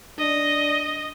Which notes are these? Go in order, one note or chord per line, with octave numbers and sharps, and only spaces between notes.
D4 D#5